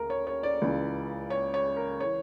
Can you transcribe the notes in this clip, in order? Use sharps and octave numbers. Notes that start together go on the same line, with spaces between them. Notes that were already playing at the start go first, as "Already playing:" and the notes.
Already playing: D2 C#3 A#4
C#5
C#5
D5
C#2 C#3 E3
C#5
C#5
A#4
E3 C#5